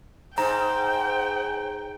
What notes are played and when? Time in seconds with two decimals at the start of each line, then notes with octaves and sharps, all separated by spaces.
0.38 G#2 C5 G5 A#5